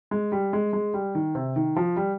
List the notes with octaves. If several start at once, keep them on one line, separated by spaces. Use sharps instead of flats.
G#3
G3
G#3
G#3
G3
D#3
C3
D#3
F3
G3